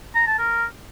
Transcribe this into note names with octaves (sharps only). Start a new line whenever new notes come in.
A#5
A5
A#4